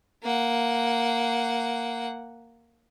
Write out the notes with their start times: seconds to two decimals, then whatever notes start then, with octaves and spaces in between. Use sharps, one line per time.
0.23 A#3 F#5